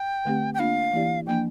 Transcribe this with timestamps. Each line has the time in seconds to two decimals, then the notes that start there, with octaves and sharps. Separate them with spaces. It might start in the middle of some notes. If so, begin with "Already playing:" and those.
Already playing: G5
0.25 D3 A3 C4 G4
0.54 G5
0.59 A#3 D4 F4 F5
0.93 E3 A#3 E4 G4 D5
1.27 F3 A#3 D4 G5